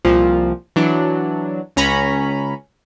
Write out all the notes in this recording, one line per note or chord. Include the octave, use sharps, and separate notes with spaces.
C2 A#2 F3
E3 F#3 D4
C#2 C#4 A#5 B5